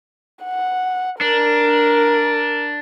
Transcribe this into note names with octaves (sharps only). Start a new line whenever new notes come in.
F#5
D4 A#4